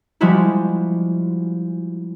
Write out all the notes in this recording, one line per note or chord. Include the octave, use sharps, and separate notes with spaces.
F3 G3 G#3 E4 F#4